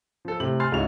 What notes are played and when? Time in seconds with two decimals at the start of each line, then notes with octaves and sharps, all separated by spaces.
0.25 F3 A4
0.40 A2 C3 F#7
0.60 G#5 C6 F6 A6 C7
0.72 C#2 G#2 E4 F#4 F7